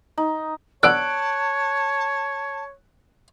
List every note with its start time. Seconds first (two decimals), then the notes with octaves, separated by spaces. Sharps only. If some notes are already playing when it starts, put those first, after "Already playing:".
0.18 D#4
0.83 B3 D4 A4 C#5 A5 F#6 D7